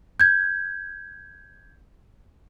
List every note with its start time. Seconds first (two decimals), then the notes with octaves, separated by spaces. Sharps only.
0.20 G6 G#6